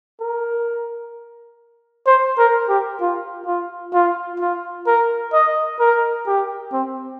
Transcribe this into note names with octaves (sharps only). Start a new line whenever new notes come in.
A#4
C5
A#4
G4
F4
F4
F4
F4
A#4
D#5
A#4
G4
C4